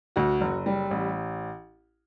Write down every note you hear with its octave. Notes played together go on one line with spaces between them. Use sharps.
D2 F#4
F#1
G3
A1